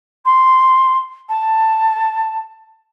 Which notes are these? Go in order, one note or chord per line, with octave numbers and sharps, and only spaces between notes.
C6
A5